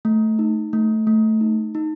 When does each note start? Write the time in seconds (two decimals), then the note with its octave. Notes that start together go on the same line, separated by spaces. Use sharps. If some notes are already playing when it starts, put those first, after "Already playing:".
0.05 A3
0.39 D#4
0.73 A3
1.07 A3
1.41 D#4
1.75 D#4